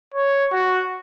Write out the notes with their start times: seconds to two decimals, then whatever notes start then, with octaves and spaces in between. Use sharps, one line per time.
0.14 C#5
0.52 F#4